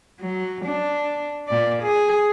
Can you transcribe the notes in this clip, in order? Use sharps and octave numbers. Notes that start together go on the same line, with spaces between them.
F#3
D4
A#2 D5
G#4